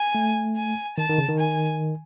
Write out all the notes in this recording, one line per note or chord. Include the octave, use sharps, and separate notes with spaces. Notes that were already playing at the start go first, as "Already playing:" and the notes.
Already playing: G#5
A3
G#5
D#3 A5
D#3
C#3
D#3
G#5